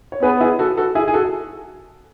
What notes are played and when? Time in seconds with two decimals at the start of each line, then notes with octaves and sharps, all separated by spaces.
0.12 C#5
0.22 B3 G#4 B4
0.40 E4 G#4
0.59 F#4 A4
0.77 F#4 A4
0.95 E4 G#4
1.08 G#4
1.14 F#4 A4